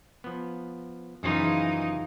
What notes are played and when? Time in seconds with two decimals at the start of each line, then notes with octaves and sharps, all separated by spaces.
0.24 F3 B3
1.23 F#2 C#3 E3 F3 D#4 F4 G#4